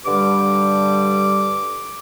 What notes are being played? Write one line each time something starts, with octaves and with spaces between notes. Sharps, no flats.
G2 D3 G3 D6